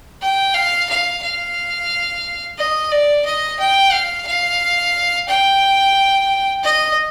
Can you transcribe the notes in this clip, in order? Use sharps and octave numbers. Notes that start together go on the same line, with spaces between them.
G5
F5
F5
F5
D#5
D5
D#5
G5
F5
F5
G5
D#5